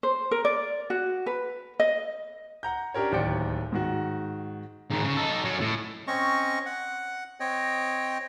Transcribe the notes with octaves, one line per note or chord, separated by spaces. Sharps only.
C5
A#4
D5
F#4
B4
D#5
F#5 A#5 G6
C#4 D4 G4 A#4 C#5
D1 D#2 C5 D5 G5 C#7
G#2 D#3 F#4
G#2 D#3
C#3
D#4 A4
F#3 C#4
A2
C4 C#4 D#5 C#6
F#5
C4 C#5 D#5 G5